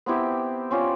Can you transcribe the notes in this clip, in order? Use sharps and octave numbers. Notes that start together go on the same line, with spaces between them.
B3 C4 E4 G4
C4 C#4 F4 D5